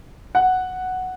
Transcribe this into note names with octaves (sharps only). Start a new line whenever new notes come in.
F#5